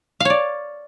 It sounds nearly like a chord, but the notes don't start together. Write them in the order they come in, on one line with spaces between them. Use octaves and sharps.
F5 C#5 D5